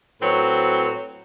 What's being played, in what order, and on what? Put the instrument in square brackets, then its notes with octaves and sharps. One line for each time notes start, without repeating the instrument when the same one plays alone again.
[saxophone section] A2 F#3 C4 B4 C#5